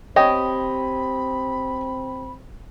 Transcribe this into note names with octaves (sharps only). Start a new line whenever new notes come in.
C4 G4 C#5 D#5 B5